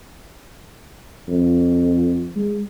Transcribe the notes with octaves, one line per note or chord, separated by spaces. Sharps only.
F2
G#3